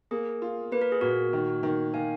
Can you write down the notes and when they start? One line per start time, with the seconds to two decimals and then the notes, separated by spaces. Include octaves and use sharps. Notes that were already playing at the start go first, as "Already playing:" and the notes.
0.11 A#3 G#4
0.42 F4
0.72 A#3 B4
0.81 A#4
0.92 G#4
1.01 A#2 F#4 A#4
1.33 D#3
1.63 D#3
1.94 D#3 F5 G#5